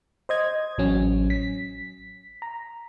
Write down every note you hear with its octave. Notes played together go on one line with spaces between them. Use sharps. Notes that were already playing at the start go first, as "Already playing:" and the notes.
C5 D#5 G#6
A1 F#3 C#4
B6
A#5